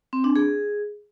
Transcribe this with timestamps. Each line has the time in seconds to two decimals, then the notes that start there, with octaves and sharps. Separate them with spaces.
0.13 C4
0.24 D4
0.36 G#4